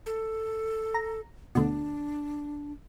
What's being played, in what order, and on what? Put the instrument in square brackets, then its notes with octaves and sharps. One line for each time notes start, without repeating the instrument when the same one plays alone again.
[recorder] A4
[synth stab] A#5
[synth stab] D2 B2 [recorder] D4